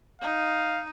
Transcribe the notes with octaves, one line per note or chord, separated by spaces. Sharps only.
D#4 F5